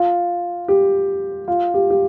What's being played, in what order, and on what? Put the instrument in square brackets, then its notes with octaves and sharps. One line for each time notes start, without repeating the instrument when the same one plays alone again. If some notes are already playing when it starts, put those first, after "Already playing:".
Already playing: [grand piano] F4
G4
F4
G4
G4